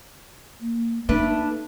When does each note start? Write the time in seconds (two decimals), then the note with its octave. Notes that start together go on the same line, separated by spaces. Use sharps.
0.61 A#3
1.09 A3 A#3 D4 D#4 B4